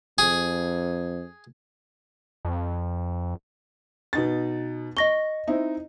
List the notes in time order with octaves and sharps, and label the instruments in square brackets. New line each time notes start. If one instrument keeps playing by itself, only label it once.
[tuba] F2 [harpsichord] G#4
[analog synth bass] F2
[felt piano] B2 D#4 A6
[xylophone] D#5 A#6 G7 [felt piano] C#6
[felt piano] C4 D#4 E4